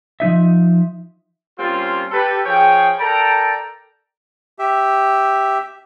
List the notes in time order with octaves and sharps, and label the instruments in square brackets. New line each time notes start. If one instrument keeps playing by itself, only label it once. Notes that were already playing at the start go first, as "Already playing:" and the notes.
[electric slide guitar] F3 G3 D#4 E5
[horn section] G3 A#3 C4 C#4 F4
G4 A4 B4
F3 G#4 C#5 G5
A4 A#4 D5 G5 A5 A#5
[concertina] G4 E5